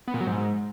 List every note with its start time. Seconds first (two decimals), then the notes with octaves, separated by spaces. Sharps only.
0.08 B3
0.14 A#2
0.21 F#3
0.27 G#2